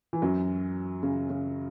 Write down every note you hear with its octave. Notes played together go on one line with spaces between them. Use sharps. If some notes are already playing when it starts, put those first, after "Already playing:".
E3
F#2 F#3
C#3
C#3